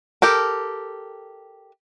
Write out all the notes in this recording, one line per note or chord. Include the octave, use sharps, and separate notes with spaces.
G4 A4 A#4